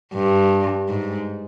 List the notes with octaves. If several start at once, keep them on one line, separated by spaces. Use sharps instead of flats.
G2
G#2